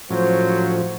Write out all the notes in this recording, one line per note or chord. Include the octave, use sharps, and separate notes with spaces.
A2 F3 F#3 C#4 C5